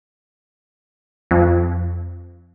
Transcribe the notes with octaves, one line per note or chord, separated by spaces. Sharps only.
F2